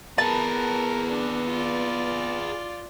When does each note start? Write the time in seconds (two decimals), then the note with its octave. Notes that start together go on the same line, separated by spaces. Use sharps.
0.18 B3 G#4 A#4 B4 A5
1.09 D4
1.49 F4 D5